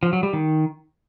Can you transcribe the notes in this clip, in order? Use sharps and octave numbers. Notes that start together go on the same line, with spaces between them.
F3
F#3
G3
D#3